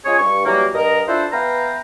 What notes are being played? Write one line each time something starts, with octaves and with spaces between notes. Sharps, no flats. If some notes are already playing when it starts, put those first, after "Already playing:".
G#3 C#4 F4 G#4 C#5
G2 C#6
E3 F#3 G3 A#3
G2 A#4 D#5
D4 E4 F4 A4 B4 C5
B3 B4 E5 F5 G5 A#5